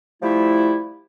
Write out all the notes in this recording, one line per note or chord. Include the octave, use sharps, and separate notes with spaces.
F3 G3 A3 E4